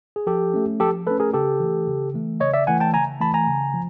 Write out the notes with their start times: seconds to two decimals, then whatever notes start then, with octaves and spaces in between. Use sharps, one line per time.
0.16 G#4
0.27 F3 G4 A4
0.54 A3 C#4
0.80 F3 G4 A4
1.06 A3 C#4 A4 B4
1.20 G#4 A#4
1.33 C#3 G4 A4
1.60 E3 A3
1.88 C#3
2.14 E3 A3
2.40 C#3 C#5 D#5
2.54 D5 E5
2.67 E3 A3 F#5 G#5
2.80 G5 A5
2.94 C#3 G#5 A#5
3.20 E3 A3 A5 B5
3.34 G#5 A#5
3.47 C#3
3.74 F3